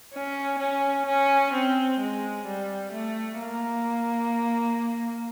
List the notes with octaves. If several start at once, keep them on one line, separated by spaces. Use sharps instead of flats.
C#4
C#4
C#4
C4
G#3
G3
A3
A#3